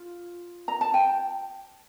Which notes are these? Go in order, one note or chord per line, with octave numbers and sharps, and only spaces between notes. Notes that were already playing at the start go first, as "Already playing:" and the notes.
Already playing: F4
A#5
A5
G5